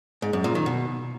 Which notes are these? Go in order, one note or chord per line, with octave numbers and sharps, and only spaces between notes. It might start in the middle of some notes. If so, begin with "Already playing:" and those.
G#2
F#2
A#2
D#3
B2